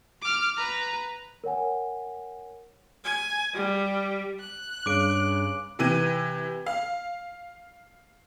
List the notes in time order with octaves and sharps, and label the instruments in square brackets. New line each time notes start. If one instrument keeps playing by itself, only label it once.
[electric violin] D6 F6
B4 A#5
[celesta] A#4 C#5 F#5 G#5
[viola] G#5
G3
[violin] F#6
[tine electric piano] G2 [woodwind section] C#3 [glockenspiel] D6 D7
[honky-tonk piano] C3 E3 D#7
F5